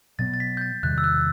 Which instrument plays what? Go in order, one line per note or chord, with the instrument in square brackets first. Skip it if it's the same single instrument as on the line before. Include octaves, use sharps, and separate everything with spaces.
[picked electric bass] B2 F#3 B3 [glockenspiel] A6
[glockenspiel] A6
B6
G6
A6
[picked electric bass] E2 C3 D#3 G3 [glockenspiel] F#6
[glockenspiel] E6
F#6